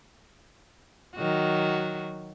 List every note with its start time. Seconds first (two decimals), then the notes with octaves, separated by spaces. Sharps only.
1.16 D#3 F#3 F#4